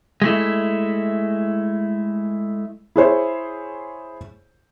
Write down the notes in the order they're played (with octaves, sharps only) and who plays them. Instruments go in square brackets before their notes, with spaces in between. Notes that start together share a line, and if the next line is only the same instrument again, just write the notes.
[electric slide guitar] G#3 A3 E4
[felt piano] E4 G#4 C5 C#5